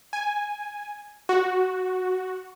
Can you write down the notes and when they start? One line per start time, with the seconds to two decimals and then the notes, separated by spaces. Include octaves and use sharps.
0.13 G#5
1.29 F#4